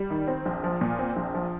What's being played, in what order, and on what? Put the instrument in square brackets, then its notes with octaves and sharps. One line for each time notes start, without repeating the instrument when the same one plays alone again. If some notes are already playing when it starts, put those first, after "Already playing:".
Already playing: [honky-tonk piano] G3
D#3
C4
A#1
F3
A#2
C4
A#1
F3